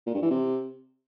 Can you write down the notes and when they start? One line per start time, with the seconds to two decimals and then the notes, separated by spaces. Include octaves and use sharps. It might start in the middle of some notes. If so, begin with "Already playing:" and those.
0.06 A#2
0.14 G2
0.22 E3
0.30 C3